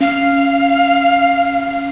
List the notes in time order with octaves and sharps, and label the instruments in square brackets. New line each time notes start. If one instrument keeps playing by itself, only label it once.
[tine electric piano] C#4 [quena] F5